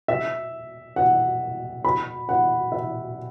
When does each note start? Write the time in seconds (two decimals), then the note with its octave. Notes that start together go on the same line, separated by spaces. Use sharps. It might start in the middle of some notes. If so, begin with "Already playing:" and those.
0.08 E5
0.96 F#5
1.84 B5
2.29 F#5
2.72 E5